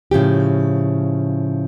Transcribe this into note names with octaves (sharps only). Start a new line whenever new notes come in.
A2 C#3 F3 G4